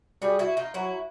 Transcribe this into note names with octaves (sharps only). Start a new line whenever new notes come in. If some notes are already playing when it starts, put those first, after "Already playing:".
G3 F#4 G#4
E4 F#4
D#4 F4
F#3 E4 F#4